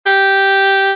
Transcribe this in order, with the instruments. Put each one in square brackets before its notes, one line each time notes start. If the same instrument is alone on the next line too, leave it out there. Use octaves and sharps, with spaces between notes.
[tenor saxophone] G4